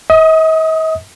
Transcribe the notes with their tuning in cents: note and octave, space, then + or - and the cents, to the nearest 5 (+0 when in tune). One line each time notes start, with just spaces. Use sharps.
D#5 +45 D#6 +10